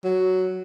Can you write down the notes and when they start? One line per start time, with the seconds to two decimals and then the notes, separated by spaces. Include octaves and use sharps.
0.04 F#3